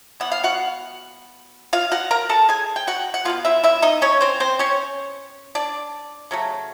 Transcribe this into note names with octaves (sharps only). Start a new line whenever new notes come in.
E3 G3 B3 F#5
F5
F#4 F#5
F4 F5
F#4 F#5
A#4 A#5
A4 A5
G#4 G#5
G5
F#4 F#5
F#5
B2 G#3 B3 F4 F5
E4 E5
E4 E5
D#4 D#5
C#4 C#5
C4 C5
C4 C5
C#4 C#5
D4 D5
C#3 F#3 A3